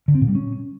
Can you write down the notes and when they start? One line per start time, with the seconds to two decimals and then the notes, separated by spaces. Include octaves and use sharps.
0.08 D3
0.15 C4
0.22 A#2
0.28 G3
0.35 C#4